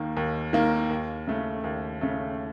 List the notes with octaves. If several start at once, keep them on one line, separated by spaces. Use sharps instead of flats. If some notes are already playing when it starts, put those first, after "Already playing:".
Already playing: D#2 D#3 A#3
D#2
D#3 A#3
D#2
C#3 A3
D#2
C#3 A3